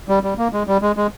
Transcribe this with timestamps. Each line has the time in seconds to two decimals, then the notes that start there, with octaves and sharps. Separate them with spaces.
0.09 G3
0.23 G3
0.38 A#3
0.53 G#3
0.67 G3
0.82 G#3
0.97 G#3